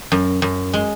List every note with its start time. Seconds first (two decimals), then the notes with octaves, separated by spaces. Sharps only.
0.12 F#2
0.42 F#2
0.73 G#3